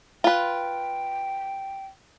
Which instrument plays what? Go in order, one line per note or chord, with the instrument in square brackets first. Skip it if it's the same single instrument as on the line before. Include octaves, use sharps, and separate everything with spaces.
[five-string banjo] F4 B4 [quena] G5